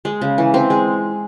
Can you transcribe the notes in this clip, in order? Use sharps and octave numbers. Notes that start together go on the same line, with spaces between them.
G#3
C#3
E3
C4
G#3